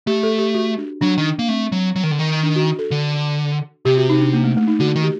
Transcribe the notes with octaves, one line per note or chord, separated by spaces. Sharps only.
A3 G4
A4
G4
F#4
D4
F#3 D4
D#3
A#3
A3 C4
F#3
F#3
D#3
D3
D#3
D4
F#4
A4
D3
C3 G4
F#4
D#4
D4
A#3
A3
A3
D#4
D3 F#4
D#3
G4